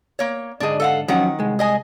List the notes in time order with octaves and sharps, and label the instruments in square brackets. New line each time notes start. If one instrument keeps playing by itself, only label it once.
[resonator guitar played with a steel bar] A#3 C#5
[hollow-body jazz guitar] G#2 D3 D#5 [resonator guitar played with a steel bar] D4 G#4
[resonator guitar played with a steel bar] A4 F5 F#5
[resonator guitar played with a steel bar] D#3 F#5 [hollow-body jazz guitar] F3 F#3 C#4
[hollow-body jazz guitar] C2 G#3
[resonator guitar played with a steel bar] G#4 D#5 G#5